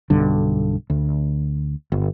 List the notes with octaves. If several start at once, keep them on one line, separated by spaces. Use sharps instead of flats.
B1 G2 D3
D2
G1